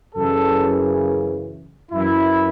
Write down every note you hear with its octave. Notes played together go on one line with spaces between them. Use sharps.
F#2 C#3 E3 A4
F#2 E3 E4